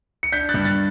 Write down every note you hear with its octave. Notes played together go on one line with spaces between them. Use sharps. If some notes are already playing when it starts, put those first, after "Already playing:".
C#7
D4 G6 B6
F#6 A6
G2
F#6 A6